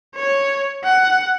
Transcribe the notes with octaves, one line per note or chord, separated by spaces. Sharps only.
C#5
F#5